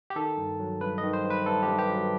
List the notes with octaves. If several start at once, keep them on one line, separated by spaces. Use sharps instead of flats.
G4
D#3 A4
G2
F#3
G2 B4
D#5
D#3
C5
G2
B4
G2 A4
G4
G2
G4
F#3